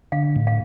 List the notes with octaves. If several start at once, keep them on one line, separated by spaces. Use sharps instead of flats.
D3 F5
A2
F5